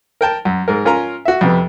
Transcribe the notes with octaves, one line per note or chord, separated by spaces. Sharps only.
A#4 G5 A5
F#2
G#2 A#4
C#4 F4 A#4 G#5 A#5
F#4 E5
F2 C3 B3